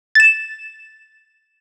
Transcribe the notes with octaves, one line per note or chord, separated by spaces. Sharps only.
A6 E7